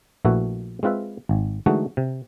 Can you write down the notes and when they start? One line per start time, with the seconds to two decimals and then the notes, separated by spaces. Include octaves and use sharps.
0.25 A#1 A#2 A3 E4 F#4 B4
0.83 G#3 C4 F4 B4 E5
1.29 G#1
1.66 D3 E3 G#3 A3 D#4 F#4
1.97 C3